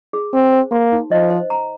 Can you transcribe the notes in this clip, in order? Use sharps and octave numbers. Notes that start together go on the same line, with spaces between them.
G#4
C4 G#5
C5
A#3 C6
D#4
F3 D#5
C5
A#5